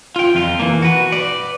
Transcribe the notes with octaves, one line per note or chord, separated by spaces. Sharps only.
F4 G5
F2 F4
E3 A#3
F#4 B4
B4 D5